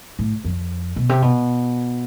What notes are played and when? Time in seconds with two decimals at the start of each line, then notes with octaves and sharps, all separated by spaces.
0.19 A2
0.45 F2
0.96 B2
1.09 C3
1.22 B2